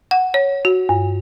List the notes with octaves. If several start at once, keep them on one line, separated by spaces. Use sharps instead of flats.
F#5
C#5
F#4
G2